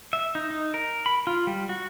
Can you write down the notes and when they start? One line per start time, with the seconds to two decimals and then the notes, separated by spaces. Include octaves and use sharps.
0.13 E5
0.35 D#4
0.50 D#4
0.74 A#4
1.06 B5
1.27 F4
1.47 G3
1.69 F#4